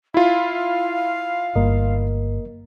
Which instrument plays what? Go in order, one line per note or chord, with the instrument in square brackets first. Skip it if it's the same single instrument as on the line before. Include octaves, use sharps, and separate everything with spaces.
[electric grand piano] E4 F4 [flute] F5
[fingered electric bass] G1 [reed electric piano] A#3 A#4 D#5